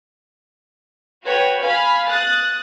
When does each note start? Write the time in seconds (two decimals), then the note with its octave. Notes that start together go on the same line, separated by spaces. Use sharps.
1.24 F#4 B4 C#5 G5
1.63 F5 G#5 B5 F6
2.07 D#6 F#6 A6